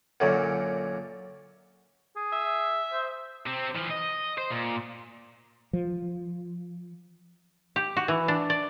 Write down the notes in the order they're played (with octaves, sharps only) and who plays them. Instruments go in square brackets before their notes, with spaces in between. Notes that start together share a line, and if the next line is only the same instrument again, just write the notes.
[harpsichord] F#2 A#2 D3 F#3
[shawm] G#4
[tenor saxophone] E5
[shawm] C5
[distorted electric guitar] C3 C4
E3 F3
D#5
C5
A#2
[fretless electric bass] F3
[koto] G4
F#4
E3
D4
D5